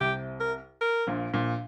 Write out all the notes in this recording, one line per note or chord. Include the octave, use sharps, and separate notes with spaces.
C2 C3 G4
A#4
A#4
A#1 A#2
A#1 A#2